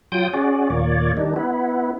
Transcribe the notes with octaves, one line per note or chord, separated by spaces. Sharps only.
F#3 F4 G5 D#6 G6
C#4 F#4 G#4 D5
D#2 A#2 A#3 C#5 D5
D#3 G3 D4 D#4
B3 E4